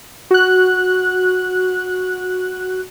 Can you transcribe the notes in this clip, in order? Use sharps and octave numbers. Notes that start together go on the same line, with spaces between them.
F#4 F#6